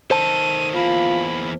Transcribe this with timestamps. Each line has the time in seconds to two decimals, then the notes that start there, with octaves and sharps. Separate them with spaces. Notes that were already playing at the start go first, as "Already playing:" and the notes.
0.11 D#3 A4 C5 A5 D#7
0.75 E2 A#3 F4 B5